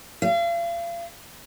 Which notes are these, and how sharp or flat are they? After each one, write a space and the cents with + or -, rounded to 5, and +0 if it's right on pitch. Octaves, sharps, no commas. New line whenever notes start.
F5 -40